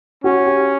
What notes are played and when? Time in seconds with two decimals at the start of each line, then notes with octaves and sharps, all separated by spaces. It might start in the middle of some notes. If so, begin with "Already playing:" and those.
0.24 C#4 F#4
0.46 G4